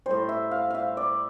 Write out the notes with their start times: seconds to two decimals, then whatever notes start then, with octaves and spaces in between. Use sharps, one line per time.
0.06 A2 G3 C5
0.29 E5
0.51 F5
0.70 E5 F5
0.97 D5